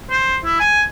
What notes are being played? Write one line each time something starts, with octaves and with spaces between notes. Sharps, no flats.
C5
E4
G#5